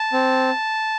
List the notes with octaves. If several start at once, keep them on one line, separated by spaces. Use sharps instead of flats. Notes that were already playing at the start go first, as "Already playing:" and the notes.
Already playing: A5
C4